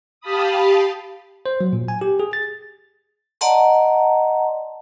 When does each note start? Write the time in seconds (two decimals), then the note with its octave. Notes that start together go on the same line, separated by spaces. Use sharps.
0.21 G4 F5 A5 B5 D#6
1.46 C5
1.61 F#3
1.73 A#2
1.88 G#5
2.01 G4
2.20 G#4
2.33 A6
3.41 D5 D#5 F#5 A5 A#5 C6